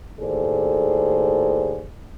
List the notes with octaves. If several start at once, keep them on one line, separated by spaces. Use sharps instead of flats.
D#2 A2 G#4 A4 C5 D5